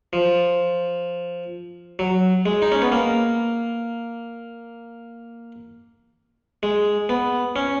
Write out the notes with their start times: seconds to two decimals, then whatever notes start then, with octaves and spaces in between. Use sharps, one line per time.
0.13 F3
1.99 F#3
2.46 G#3
2.62 D#4
2.72 C#4
2.82 B3
2.92 A#3
6.63 G#3
7.09 B3
7.56 C#4